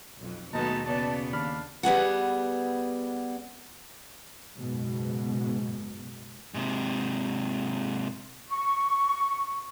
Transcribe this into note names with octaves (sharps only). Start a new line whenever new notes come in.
B1 F2
D#2 B2 F#3 G#3 A3 B3 D#4 A5
C#3 B3 D5 A5
D#2 D4 F5 B5 F6
G3 B3 G#4 F#5
F#1 G#2 B2
G#2 C3
C#6